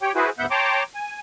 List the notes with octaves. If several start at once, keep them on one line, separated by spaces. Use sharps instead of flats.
G4 C#5 G5
E4 F#4 G#4 B4 C5
D2 G#2 B3 E5 F#5 G6
C#5 G5 A5 A#5 C6 D6
G#5